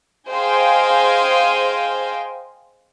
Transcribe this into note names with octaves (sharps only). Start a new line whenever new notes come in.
G#4 C5 D#5 F5 G5 G#5